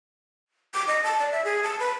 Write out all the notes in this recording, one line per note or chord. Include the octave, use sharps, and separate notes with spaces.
D6
D#5
A5
D5
E5
G#4
A5
B4